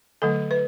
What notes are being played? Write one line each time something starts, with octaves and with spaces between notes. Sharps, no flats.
D3 F#3 A3 A4
B4